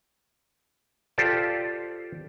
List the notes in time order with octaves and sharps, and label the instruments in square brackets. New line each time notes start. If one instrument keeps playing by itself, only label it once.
[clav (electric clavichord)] F4 G4 A4 C5 D5